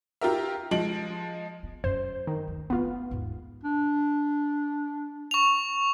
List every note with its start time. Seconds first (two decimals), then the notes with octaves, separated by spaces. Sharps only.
0.21 F4 G4 A#4 E5
0.71 F3 G#3 D7 F#7
1.63 B3
1.84 F#2 C5
2.27 D#3
2.48 D2
2.70 G#3 A3 B3 F4
3.11 D#2 G#2
3.64 D4
5.31 C#6 F7